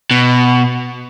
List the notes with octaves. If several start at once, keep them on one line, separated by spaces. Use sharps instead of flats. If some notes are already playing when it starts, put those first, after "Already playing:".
B2